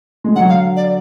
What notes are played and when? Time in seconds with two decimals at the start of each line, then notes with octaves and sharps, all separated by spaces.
0.24 G#3
0.35 D3 F#3 F#5
0.49 F5
0.76 D5